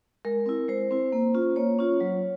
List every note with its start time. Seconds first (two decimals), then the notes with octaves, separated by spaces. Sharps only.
0.25 G#3 A#4
0.46 C4 E4
0.68 G#3 C5
0.91 C4 E4
1.12 A#3
1.34 C#4 F4
1.56 A#3 C#5
1.79 C#4 F4
2.01 F#3